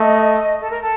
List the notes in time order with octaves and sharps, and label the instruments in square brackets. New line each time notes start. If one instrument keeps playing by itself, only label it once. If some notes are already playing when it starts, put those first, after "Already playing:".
Already playing: [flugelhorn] A3 [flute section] D#5
[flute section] A4
A#4
A4